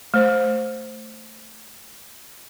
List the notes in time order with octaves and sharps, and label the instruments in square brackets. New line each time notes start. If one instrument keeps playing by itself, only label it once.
[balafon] A3 C5